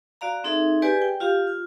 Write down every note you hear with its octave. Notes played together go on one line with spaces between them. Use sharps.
F#4 D5 F5 A#5
C4 D#4 G#4 A4 E5
G4 G#4 B4 D5 G#5
G5
F4 G4 F5
F4